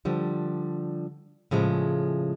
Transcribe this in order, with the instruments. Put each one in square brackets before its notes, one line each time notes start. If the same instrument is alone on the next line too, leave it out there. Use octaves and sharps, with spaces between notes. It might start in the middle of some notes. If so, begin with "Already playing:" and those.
[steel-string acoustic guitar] D3 F3 G3
A2 C#3 F3 G#3